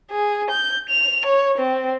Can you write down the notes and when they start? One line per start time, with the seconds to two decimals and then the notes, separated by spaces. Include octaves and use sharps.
0.11 G#4
0.51 G6
0.89 F7
1.26 C#5
1.58 C4